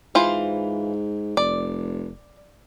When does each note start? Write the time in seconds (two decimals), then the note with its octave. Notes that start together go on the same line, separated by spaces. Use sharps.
0.15 G#2 E3 F4 C5
1.37 F1 D5